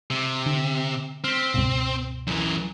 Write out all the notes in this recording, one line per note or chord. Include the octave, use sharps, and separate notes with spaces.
C3
D3
C4 F6 B6
C#2 G2 B2
F#2 E3